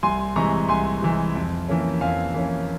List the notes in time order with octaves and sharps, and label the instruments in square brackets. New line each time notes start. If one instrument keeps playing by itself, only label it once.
[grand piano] C2 G#5 C6
C3 E3 G#3 A#5 C#6
C2 G#5 C6
C3 E3 G#3
F2
E3 A#3 C#4
F2 F5 G#5
E3 A#3 C#4